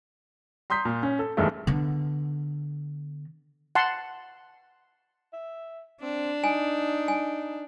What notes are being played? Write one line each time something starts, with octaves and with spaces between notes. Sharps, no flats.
A#5 C6 D#6 G6 B6
A#2
C#4
A4
B1 G2 D#3 E3 G#3 A3
D3 B3
F#5 A5 C6
E5
C4 D4
D#4 G#5
G#5